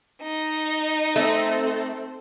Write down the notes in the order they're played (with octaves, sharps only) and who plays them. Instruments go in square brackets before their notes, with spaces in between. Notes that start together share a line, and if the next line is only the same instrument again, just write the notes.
[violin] D#4
[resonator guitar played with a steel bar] A3 [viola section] C4 A4 C5